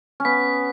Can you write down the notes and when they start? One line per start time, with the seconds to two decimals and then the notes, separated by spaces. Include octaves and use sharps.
0.20 C#4
0.25 B3 B6